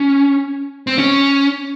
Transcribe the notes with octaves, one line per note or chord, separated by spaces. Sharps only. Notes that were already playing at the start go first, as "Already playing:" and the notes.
Already playing: C#4
C4
C#4